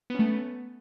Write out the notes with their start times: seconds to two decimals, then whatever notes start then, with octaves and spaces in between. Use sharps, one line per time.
0.10 B3
0.15 C#4
0.19 A3